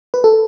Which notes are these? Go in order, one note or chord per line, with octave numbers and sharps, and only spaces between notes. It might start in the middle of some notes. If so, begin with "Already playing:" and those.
B4
A4